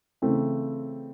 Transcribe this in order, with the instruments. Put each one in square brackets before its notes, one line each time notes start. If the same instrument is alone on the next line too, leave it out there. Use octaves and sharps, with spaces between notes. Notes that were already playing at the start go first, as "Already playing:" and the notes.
[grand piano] C#3 E3 A3 C4